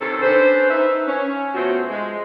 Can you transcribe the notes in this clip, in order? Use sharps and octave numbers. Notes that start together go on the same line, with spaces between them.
C3 D#3 C4 C#4 A4
C#4 D4 B4 C5
D#4 B4 E5
C#4
B2 F3 A3 C4 F#4 C#5
G#3